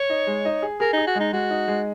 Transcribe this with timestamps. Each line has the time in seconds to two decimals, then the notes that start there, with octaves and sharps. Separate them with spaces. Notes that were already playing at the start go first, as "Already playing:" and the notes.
Already playing: C#5
0.10 D#4
0.27 G#3
0.45 D#4
0.62 G#4
0.80 G#4 A#4
0.93 D#4
0.98 G#4
1.07 F#4
1.15 G#3 D#4
1.33 G#3 F#4
1.50 D#4
1.68 G#3